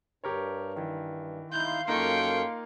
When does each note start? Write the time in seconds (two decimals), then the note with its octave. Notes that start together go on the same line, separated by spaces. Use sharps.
0.24 G2 G4 A#4 C#5
0.76 D#3 E3
1.53 D#4 E4 F5 C6 G6
1.88 F#2 A#3 D#4 F4 A4 G5 C#6